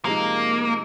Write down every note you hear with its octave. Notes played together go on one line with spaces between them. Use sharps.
C3 F3 G#3 A#3 D#4